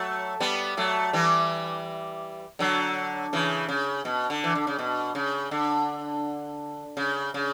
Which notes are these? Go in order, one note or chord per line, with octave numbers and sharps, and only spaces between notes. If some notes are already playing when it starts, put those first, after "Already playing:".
Already playing: F#3 A3
G3 B3
F#3 A3
E3 G3
D3 F#3
C#3 E3
C#3
B2
D3
E3
D3
C#3
B2
C#3
D3
C#3
C#3